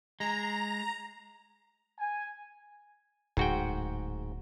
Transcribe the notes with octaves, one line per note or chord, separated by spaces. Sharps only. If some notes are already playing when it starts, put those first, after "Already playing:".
G#3 A#5
G#5
D1 G#2 F#4 G5